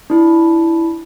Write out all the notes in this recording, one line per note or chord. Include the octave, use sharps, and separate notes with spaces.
D4 E4